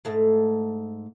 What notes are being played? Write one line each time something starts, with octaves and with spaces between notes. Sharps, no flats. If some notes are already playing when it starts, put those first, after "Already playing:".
G#2 A3